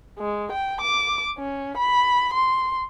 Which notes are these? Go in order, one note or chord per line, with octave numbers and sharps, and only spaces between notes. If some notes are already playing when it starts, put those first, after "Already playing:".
G#3
G5
D6
C#4
B5
C6